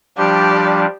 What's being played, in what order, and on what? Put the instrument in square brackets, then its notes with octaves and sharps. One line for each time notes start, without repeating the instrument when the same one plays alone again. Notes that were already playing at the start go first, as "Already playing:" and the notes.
[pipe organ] F3 G3 D4 [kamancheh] G4 D5